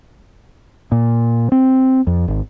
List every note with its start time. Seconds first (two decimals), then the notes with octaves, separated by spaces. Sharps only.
0.92 A#2
1.52 C4
2.07 F2
2.28 G#1